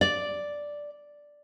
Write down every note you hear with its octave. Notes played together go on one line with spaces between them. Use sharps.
D5